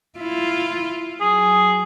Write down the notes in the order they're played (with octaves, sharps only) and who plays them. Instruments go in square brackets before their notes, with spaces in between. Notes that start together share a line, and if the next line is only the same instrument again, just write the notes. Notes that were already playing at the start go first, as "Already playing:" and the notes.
[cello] E4 F4
[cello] F#3 [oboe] G#4